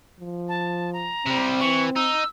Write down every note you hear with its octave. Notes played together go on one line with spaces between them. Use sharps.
F3
A5
A#5
C3 G3 C4
E3 C#6
D#4 E6